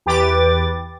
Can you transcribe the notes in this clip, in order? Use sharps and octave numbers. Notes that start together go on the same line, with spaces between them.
E2 G4 B4 D6 A6